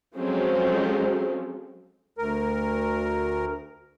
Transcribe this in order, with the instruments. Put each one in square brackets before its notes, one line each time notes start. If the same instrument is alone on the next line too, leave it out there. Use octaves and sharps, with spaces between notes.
[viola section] F3 F#3 G#3 C4 C#4 A4
[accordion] D2 A#4